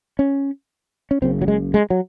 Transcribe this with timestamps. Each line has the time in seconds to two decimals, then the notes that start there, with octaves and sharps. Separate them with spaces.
0.19 C#4
1.11 C#4
1.22 F#1 F#2 C#3 C4
1.42 F#3
1.48 G#3
1.74 G#3
1.90 F#3